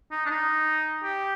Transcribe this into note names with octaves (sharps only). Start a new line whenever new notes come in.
D#4
D4
D#4
G4